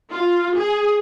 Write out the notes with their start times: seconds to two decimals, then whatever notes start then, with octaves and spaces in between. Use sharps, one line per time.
0.12 F4
0.55 G#4